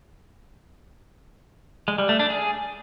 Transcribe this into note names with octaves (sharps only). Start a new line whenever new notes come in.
G#3
G3
A3
D4
G#4